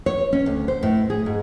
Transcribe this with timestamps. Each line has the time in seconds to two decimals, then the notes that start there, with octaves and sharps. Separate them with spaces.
0.06 C#5
0.33 C#4
0.46 D2
0.68 C5
0.83 A2
1.10 G#4
1.26 G#2